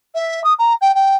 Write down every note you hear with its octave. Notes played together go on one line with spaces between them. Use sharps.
E5
D#6
A#5
G5
G5